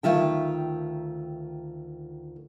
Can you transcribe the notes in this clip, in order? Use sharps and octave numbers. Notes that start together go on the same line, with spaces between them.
D2 C3 D#3 F4 E5 G5